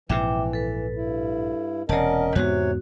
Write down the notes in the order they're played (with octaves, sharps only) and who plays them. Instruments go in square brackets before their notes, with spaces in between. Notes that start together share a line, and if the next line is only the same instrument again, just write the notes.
[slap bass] A#1 G#2 C3 [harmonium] E3 [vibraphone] E5 G5 D6
[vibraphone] A4 B4
[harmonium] G2 E4
[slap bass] E1 C3 [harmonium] C#4 A#4 D#5 [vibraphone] D5 F#5 A5
[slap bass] E2 G#2 B3 [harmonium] C3 C#5 [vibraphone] F#4